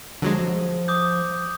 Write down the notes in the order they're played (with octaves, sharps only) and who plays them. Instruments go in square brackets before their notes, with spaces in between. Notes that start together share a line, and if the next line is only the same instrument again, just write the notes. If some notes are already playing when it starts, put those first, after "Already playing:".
[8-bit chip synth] D3 F#3 G#3 [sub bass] F3
[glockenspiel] D6 D#6 G6